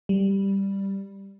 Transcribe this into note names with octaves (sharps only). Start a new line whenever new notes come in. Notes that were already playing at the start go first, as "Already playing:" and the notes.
G3